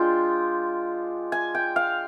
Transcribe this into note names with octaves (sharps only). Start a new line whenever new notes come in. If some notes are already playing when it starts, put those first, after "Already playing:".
Already playing: G#3 D4 F4 G5
G#5
G5
F5